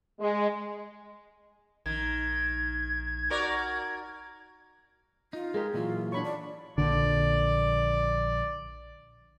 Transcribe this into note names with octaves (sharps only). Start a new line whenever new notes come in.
G#3
A#1 D#3 G#6
F#4 A#4 D5
D#4 F4
G#3 G4 G#4 A#4
A#2 E3 F#3 F4
D4 C#5 B5 C#6
D5
A#1 D3 D5